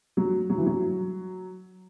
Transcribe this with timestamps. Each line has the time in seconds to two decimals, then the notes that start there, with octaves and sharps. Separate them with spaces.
0.17 F#3
0.50 F#3
0.58 E3
0.66 F#3